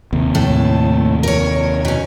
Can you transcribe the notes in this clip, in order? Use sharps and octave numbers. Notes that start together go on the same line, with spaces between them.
D#2 C3
A2 A4
A#4 C#5
B2 C#4